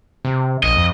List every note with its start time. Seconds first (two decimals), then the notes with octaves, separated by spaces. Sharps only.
0.25 C3
0.63 A#1 D#5
0.76 F2